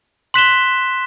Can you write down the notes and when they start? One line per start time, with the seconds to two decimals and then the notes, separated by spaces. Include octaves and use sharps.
0.34 C6 F#6 B6 E7 G7